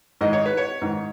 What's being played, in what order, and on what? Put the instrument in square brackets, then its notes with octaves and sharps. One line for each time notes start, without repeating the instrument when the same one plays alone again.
[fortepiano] G#2 D#3 D#5
C#5
B4
C#5
G#2 D#3